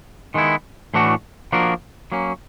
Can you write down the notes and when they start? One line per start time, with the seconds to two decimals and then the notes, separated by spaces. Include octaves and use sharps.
0.34 D#3 G#3 B3 E4
0.94 A2 E3 A3 D4 F#4
1.52 F3 A#3 D4 F#4 A#4
2.12 F#3 A#3 C#4